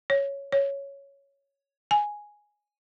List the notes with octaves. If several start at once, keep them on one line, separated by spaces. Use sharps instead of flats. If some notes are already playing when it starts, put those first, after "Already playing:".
C#5
C#5
G#5